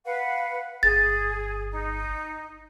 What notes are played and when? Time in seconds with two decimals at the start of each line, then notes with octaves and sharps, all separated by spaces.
0.05 B4 F5 F#5
0.83 G1 G#4 A6
1.72 D#4